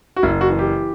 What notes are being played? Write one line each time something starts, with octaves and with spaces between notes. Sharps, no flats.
F#4
F#1 E4
F#4
E3
G4